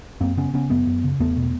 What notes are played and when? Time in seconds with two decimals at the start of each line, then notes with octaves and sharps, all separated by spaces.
0.21 F#2 A#3 C4
0.37 C#3 B3 C#4
0.54 C#3 B3 C#4
0.70 F#2 A3 B3
0.87 F#2
1.04 C#3
1.20 E2 A3 B3
1.37 B2